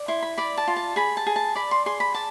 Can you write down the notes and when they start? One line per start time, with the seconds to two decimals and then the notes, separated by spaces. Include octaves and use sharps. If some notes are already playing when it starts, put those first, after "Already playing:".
Already playing: D5
0.08 E4 C6
0.22 B5
0.38 D5 B5
0.57 A5
0.67 F4
0.76 A5
0.96 G#4 B5
1.17 A5
1.26 G#4
1.36 A5
1.55 D5 B5
1.71 C6
1.86 G#4 C6
2.00 B5
2.14 D5 A5